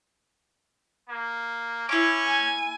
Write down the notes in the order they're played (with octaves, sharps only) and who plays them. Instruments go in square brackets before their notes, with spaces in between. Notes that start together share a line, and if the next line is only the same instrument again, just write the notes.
[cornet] A#3
[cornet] C#4 [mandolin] E4 D6
[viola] G#5